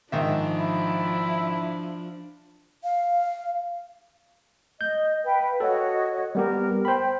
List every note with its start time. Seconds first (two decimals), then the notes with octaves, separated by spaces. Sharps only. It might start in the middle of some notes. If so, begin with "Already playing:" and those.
0.12 G#2 D#3 F3 D4 E5
0.59 E4
2.84 F5
4.81 D#5 G6
5.25 B4 F5 G5
5.60 F#4 A4 C#5 D#5
6.35 G3 B3 G4 A#4
6.85 C5 G5 B5